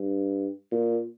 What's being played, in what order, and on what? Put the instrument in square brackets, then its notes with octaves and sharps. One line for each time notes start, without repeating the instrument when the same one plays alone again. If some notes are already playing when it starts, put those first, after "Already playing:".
Already playing: [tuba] G2
A#2